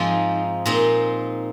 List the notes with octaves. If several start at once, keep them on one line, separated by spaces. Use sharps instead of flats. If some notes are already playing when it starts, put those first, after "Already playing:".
Already playing: G#2 F3 G#3 C4 D#4 F5
A#2 G#3 C4 D#4